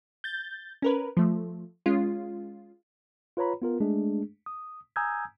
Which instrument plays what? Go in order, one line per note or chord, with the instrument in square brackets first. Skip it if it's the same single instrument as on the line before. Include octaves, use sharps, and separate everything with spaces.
[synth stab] G6 A6
C#4 A#4 B4
F3 A3
G#3 C#4 F4
[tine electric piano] F4 B4 C#5 A#5 B5
B3 F4 A#4
G#3 A3 D4 G#4
D#6
G#5 A#5 D#6 E6 G6 G#6